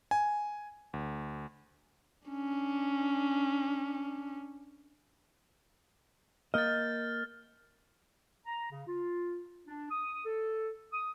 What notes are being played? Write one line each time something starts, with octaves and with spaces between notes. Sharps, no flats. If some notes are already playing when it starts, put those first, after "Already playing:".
G#5
D2
C#4 D4
A#3 D#5 F6 G6 A6
A#5
C#3
F4
D4
D#6
A4
D#6